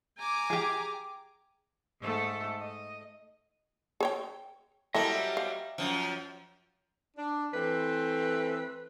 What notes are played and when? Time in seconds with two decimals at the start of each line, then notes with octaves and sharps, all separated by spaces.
0.18 G#5 A#5 D6
0.50 G4 G#4
2.02 G#2 A3 A4
2.59 D#5
4.00 G#4 C#5 G5
4.94 F#3 G3 E4 A4 A#4 D#5 E5
5.37 F5
5.78 F#2 F3
7.17 D4
7.54 E3 A3 C4 B4